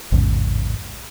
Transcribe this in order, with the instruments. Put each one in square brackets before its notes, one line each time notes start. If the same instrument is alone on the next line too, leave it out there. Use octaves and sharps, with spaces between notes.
[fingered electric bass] A1 E2 G#2 C#3